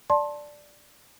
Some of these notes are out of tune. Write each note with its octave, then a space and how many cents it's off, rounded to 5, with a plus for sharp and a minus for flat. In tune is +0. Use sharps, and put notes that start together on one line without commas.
D5 +0 A5 +0 C6 +25